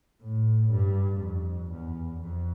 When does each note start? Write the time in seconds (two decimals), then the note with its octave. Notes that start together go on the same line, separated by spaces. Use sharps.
0.22 A2
0.71 G2
1.21 F2
1.71 E2
2.20 F2